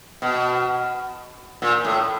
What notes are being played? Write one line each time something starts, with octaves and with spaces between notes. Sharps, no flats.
B2
A#2
A2